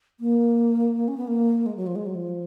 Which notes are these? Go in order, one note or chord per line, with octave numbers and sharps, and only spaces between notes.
A#3
C#4
B3
A#3
G#3
F#3
F3
G#3
F#3
F3